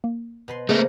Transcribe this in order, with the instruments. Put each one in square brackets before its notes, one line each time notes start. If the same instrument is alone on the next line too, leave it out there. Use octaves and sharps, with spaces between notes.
[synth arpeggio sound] A#3
[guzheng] B2 B4 C6
[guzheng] C#3 F3 [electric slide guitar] A3 A#3 [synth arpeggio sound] G#4 D#5 B6